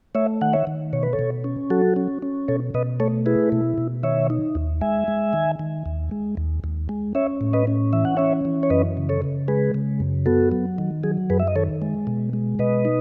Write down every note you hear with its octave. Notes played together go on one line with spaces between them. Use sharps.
A3 C#5 E5
D#3 F#5
C#5 E5
D#3
B2 C#5
B4
A4 C#5
B2
C#4
F#3 F#4 A4
C#4
C#4
B2 A4 C#5
B2 B4 D#5
A3 A4 C#5
E4 G#4 B4
B2
B2
D#3 C#5 E5
D#4
D#2
G#3 E5 G#5
G#3
D#3
D#3
D#2
G#3
D#2
D#2
G#3
C#4 C#5 E5
A2
B4 D#5
C#4
E3 E5
F#5
C#4 C#5 E5
E3
C#5
F#2 B4 D#5
C#3
A4 C#5
C#3
G#3 G#4 B4
C#3
F#2
B3 F#4 A4
F#3
D#3
F#3 G#4
F#2 G#4 B4
E5
D#5
D#3 A4 C#5
G#3
B2
G#3
B2 B4 D#5
D#4